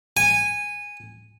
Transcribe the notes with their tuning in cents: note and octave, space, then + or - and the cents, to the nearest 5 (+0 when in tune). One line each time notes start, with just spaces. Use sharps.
G#5 -15